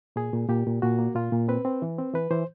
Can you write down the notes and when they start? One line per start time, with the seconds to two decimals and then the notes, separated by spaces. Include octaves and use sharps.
0.16 A#2 G#4
0.33 A#2
0.49 A#2 G4
0.66 A#2
0.82 A#2 F#4
0.99 A#3
1.15 A#2 F4
1.33 A#2
1.48 C4 B4
1.65 C4
1.82 E3
1.98 C4
2.14 E3 B4
2.31 E3 C5